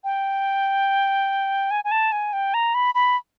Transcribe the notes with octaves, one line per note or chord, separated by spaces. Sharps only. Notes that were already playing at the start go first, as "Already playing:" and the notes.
G5
G#5
G#5
A5
G#5
G5
A#5
B5
B5